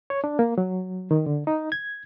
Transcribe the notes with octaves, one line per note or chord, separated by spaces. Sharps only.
C#5
D4
A#3
F#3
D#3
D3
D#4
G#6